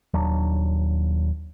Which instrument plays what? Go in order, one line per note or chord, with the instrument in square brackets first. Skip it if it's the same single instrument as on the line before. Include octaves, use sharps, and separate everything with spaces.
[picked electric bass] D#1 D#2 F#3 D4